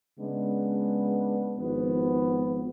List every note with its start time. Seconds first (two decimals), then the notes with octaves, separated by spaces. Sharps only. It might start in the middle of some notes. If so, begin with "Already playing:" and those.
0.18 C#3 G#3 B3 D4
1.56 G#1 F3 B3